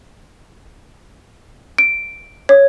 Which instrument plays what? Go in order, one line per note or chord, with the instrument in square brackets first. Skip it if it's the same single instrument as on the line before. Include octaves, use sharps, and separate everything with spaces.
[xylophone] D7
C#5